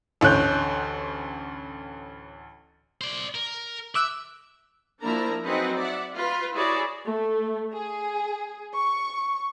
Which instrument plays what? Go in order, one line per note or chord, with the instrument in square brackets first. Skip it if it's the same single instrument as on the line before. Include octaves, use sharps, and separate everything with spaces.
[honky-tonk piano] A1 D2 C#5 F#6 G6
[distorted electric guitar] C5 D5
A#4
[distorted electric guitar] E5 [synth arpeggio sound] D6 E6 F#6
[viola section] F3 A#3 D4 E4 A#4 A#5
F#3 C4 D#4 G#4 B4 F#5
D5 E5 F#5
F4 B4
E4 F#4 G#4 C#5 D5
[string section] A3
G#4
C#6